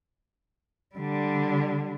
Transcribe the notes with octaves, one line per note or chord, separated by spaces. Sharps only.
D3 G3